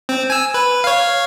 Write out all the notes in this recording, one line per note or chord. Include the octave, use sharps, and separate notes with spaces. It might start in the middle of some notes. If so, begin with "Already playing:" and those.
C4
G#5 E6
B4
C#5 F5